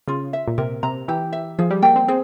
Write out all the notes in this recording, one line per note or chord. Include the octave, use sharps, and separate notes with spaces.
C#3 F4
E5
A#2
C3 A#4
C3 A#5
E3 G4
E5
F3 G#4
G3
A#3 G5
C4
C4 G#4